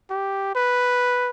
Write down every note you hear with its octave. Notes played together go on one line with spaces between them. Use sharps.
G4
B4